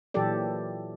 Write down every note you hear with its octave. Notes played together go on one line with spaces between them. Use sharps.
A#2 E3 F#3 G4 A4 D5